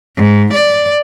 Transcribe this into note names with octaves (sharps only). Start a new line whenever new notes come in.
G#2
D5